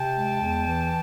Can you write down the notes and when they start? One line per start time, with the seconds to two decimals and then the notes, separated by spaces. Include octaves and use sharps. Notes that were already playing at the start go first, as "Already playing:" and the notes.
Already playing: C3 G5 A5
0.16 G#3
0.41 E2
0.67 E3